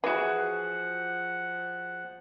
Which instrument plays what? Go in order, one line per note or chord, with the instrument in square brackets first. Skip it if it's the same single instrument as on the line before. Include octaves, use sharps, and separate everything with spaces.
[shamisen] E3 E4 [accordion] F3 F#5 [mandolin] F#4 G#4